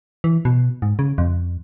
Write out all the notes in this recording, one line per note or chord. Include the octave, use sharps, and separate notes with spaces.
E3
B2
G#2
C#3
F2